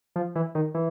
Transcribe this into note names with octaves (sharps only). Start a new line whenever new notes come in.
F3
E3
D#3
E3